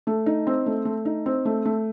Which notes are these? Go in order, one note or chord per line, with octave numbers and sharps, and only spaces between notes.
A3
D#4
C4
A3
A3
D#4
C4
A3
A3